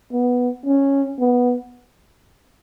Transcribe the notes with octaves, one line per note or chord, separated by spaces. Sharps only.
B3
C#4
B3